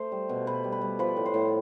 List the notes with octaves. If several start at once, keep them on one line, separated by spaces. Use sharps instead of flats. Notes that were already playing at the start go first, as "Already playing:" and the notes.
Already playing: A3 C5
G3
B2
B2 B4
G3
B4
G3
F3 B4
A2
C5
A2